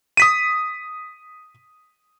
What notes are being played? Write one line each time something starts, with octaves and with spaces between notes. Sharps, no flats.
D#6 B6 D#7